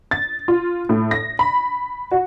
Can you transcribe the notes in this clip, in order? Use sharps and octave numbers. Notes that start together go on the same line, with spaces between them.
A6
F4
A2
A#6
B5
F#4